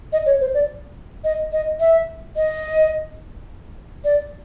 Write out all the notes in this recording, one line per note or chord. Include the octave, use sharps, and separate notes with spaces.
D#5
C#5
C5
D5
D#5
D#5
E5
D#5
D5